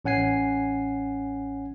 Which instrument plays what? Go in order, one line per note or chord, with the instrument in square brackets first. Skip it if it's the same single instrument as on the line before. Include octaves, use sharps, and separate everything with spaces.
[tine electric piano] A1 C#4 F#5 G#5 C7